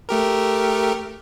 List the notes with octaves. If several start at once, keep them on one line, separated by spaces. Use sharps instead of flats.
A3 G4 A#4